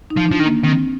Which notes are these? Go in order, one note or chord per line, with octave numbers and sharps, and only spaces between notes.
D#4
F3
F3 D4
D#3
A#3
D#3 C4